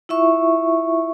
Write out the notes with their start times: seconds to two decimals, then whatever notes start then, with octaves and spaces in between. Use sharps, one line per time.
0.09 E4 F4 E5 C#6